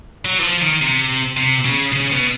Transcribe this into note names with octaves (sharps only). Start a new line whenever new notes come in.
F#3
E3
F3
D#3
C3
C3
C#3
C#3
B2